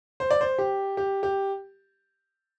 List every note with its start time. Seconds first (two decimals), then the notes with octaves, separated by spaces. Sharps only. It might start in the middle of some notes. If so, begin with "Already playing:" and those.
0.20 C5
0.31 D5
0.41 C5
0.58 G4
0.97 G4
1.23 G4